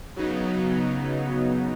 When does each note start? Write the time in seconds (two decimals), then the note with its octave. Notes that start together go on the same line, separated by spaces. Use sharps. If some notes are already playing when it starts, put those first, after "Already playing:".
0.16 C#3 F#3 B3 D#4